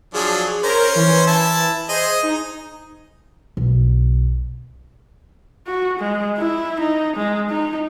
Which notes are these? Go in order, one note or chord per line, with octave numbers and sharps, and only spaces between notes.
F3 F#3 D4 G#4
C#4 A#4 C5
E3
E4 A5
G#4 C5 D#5
D#4
F#1 B1
F#4
G#3
E4
D#4
G#3
D#4